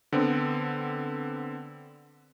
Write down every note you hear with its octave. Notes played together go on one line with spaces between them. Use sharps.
D3 B3 C4